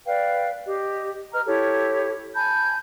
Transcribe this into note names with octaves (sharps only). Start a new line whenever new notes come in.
B4 D5 F5 G5
G4 D#5
B4 D#5 A#5 F6
E4 G4 A4 C#5
G#5 A5 B5 G6